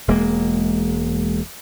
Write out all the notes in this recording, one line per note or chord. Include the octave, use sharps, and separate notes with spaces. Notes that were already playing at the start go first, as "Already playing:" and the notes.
E1 G#3 A#3